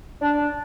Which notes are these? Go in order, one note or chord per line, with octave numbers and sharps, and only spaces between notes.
D4